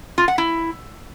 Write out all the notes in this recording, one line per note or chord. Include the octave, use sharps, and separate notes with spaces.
F4
F#5
E4